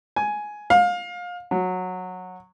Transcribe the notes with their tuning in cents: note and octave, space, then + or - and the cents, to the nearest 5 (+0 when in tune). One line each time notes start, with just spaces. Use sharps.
G#5 +10
F5 +25
F#3 -15